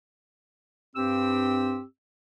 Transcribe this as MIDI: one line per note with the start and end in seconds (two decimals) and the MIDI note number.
0.96 1.82 43
0.96 1.82 60
0.96 1.82 67
0.96 1.82 88